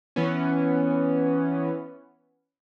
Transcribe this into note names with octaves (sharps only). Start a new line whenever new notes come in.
E3 B3 C#4